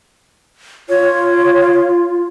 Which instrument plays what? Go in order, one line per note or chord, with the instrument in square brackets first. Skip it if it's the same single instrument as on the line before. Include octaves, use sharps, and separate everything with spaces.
[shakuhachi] F4 [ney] C#5